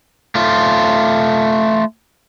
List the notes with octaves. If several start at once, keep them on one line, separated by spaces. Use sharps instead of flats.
A3 F4